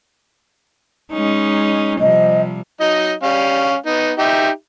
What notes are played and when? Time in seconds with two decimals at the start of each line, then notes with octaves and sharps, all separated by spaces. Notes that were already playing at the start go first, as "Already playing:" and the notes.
1.13 G#3 C#4 D#4
2.00 C3 F3 G3 D#5
2.81 F#3 D#4 D#5
3.23 G3 C#4 F5
3.86 B3 D#4
4.18 D#4 G4 E5